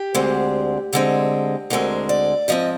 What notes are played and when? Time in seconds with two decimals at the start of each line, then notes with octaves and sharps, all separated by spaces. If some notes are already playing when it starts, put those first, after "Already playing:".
Already playing: G4
0.14 D2 D3 G#3 C4
0.93 D2 D3 G#3 C4
1.70 D2 D3 G#3 C4 A#4
2.09 D5
2.48 G#2 F3 C4 D#5